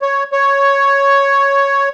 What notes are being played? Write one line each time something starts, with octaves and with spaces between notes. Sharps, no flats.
C#5
C#5